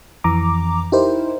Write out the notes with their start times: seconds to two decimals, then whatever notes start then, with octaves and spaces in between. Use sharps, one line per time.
0.24 F2 E3 A#5 D6
0.92 D#4 E4 G4 A#4 C5